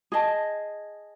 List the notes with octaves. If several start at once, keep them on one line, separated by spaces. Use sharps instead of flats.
G#4 D#5 A5